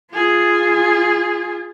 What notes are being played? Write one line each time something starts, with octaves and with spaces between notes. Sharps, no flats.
F4 G#4